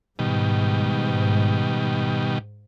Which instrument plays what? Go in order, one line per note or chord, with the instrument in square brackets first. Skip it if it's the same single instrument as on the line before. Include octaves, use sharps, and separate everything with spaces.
[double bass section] G#2 [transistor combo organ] B2 D#3 G3